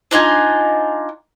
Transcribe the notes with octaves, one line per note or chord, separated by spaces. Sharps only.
D4 D#4 F4 G#5